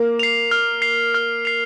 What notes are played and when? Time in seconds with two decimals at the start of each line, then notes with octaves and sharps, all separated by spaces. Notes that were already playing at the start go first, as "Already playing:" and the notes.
Already playing: A#3
0.19 C7 F7
0.51 F6
0.82 C7 F7
1.14 F6
1.45 C7 F7